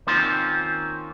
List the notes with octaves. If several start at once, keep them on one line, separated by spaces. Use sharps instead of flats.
D#3 A#3 C4 C#4 F4 C5